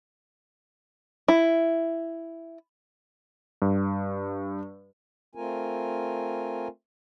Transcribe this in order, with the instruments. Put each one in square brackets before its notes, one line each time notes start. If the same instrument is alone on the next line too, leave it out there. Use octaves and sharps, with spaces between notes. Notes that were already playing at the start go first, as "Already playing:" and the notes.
[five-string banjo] E4
[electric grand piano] G2
[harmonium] A3 C4 F4 A#4 G#5